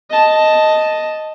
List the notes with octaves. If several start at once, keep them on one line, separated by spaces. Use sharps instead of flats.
D#5 A5